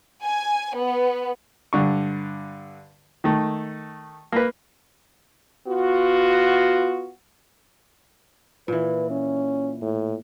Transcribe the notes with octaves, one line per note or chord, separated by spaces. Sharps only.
G#5
B3
G2 D3 C#6
D#3 A3
A#3 B4
B3 F4 F#4
A#2 E3 B4
C#4
A2